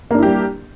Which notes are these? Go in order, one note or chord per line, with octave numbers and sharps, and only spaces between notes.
G3 A#3 D4 E4 G4